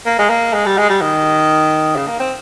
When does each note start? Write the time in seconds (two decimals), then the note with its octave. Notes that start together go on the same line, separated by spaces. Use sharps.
0.06 A#3
0.19 G#3
0.30 A#3
0.53 G#3
0.66 G3
0.78 G#3
0.89 G3
1.01 D#3
1.96 C#3
2.07 A#3
2.20 C4